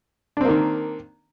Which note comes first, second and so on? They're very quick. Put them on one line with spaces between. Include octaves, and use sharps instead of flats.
D4 C4 A#3 D#3